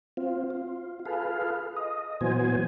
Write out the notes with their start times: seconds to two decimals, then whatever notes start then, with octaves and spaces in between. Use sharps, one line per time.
0.17 C4 F4
0.50 F4
1.06 F4 G#4 A4 B4 F5
1.76 D#5
2.21 A#2 E3 F#3 B3 C5 G#5